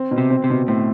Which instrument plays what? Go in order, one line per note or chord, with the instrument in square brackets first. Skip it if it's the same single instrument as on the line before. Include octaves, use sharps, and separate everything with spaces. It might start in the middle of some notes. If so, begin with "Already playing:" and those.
Already playing: [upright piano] C4
B2
[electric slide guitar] C3
[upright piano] C4
[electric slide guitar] C3
[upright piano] B2
[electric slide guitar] A2 [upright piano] C4